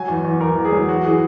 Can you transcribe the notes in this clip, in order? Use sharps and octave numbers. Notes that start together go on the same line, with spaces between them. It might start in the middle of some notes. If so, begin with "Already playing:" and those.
Already playing: F#3 G#5
E2
E2
E2 A#4
E2
G#4
F#3
E3 F#4
E3 G#4